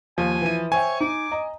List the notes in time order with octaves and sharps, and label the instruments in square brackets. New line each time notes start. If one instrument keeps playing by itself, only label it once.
[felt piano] D#2 [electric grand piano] F3 [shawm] G#5
[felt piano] E3 E4 D#7
[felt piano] C5 E5 G5 [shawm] C#5 [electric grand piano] G#5
[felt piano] D#4 [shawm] D6
[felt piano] D#5 A#5